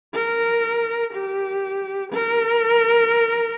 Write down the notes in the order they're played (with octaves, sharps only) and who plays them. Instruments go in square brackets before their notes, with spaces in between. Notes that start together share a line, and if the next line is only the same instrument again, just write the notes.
[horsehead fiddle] A#4
G4
A#4